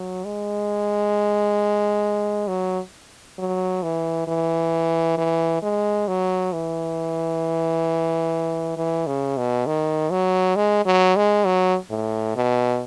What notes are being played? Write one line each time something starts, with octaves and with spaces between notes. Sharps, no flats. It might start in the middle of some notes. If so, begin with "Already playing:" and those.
Already playing: F#3
G#3
F#3
F#3
E3
E3
E3
G#3
F#3
E3
E3
C#3
B2
D#3
F#3
G#3
F#3
G#3
F#3
A2
B2